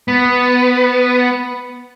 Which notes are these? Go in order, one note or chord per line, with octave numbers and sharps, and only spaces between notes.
B3